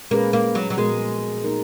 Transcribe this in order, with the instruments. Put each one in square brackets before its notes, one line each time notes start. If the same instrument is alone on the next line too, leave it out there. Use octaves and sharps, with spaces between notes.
[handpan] A#2 G#3 C#4 G#4 B4 [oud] A#3
[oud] A#3
F#3
F#3
[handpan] A#2 F3 B3 F#4 A#4 [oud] G#3
[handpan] A#3 D#4 A#4